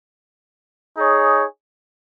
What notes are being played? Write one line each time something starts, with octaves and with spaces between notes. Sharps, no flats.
D#4 G#4 C#5